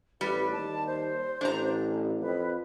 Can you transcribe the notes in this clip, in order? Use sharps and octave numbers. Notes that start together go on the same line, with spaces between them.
A1 G3 B4
D#2 A5
C5
A1 D4 A#5
F2 B4